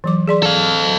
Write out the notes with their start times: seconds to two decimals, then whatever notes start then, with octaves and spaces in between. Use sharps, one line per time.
0.04 E3 F#3 D6
0.27 G#4 D5 C6
0.43 A4 F5